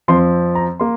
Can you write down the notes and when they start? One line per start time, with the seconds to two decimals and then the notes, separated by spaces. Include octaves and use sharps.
0.08 F2 F3 C4 C6
0.55 A#5
0.80 A#3 C6